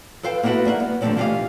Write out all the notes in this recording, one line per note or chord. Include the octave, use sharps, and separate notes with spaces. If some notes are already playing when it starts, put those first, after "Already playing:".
A4 B4 C5 F5 G5
A#3 B3 E4 F#4 A4 B4
G3 A#3 E5 F#5
B3
D3 F3 G3 A3 C4 C#4
E3 E4 F4 G4 D#5 F5